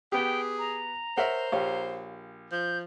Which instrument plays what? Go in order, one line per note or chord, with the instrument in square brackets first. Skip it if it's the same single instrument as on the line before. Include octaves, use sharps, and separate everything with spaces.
[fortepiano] B3 G4 [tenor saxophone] G#4 [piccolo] G5
[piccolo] A#5
[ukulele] A#4 C#5 [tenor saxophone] C5 [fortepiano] E5 F#5
[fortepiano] A#1 [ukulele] G4 C#5 F5
[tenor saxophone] F3 [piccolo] G6